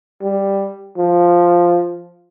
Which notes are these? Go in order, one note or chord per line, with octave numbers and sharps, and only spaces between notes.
G3
F3